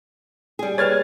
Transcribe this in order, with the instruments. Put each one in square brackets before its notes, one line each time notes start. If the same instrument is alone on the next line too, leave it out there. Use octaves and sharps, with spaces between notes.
[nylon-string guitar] G3 G#4
[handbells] B4 C#5 [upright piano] F6 G#6 A6